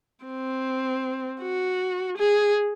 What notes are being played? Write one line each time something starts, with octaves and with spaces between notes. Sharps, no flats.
C4
F#4
G#4